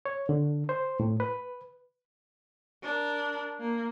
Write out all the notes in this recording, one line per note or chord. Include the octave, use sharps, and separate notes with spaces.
C#5
D3
C5
A2
B4
D4 A#4
A#3